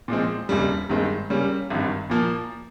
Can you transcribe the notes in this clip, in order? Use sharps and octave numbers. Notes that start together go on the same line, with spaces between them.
A#2 F3 G#3 C4
F1 D#2 C#3 G3
G2 D#3 G#3 C4
C#3 G3 A#3 C#4
G#1 G2 D#3
A#2 F3 A#3